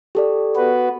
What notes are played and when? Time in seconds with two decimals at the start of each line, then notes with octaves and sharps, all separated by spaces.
0.15 G4 A4 D5
0.56 B3 F#4 B4